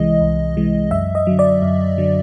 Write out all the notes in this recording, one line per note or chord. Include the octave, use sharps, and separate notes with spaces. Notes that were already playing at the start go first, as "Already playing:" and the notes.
Already playing: C2 C3 E3 G#3 D#5
C2
C3 E3 G#3
F#2 E5
D#5
D3 F#3
D5
F#2
D3 F#3